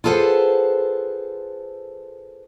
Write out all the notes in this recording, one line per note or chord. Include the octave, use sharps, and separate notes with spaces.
F4 G#4 A4 B4 C5 F#5